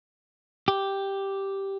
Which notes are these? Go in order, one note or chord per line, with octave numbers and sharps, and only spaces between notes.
G4